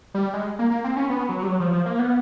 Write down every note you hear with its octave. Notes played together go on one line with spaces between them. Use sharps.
G3
G#3
A#3
A#3
C4
C#4
B3
F#3
G3
F#3
F3
F3
A#3
B3